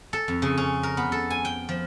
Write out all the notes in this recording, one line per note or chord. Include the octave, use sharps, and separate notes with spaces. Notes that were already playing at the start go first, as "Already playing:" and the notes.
A4
F2
C#3
C#4
A#4
B3
A4
G#5
G5
F3